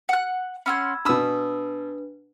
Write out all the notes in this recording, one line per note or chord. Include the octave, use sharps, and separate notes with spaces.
F#5 F#6
C#4 F#4 B5 C6 E6 G#6
B2 D4 B4 B5 D#6 E6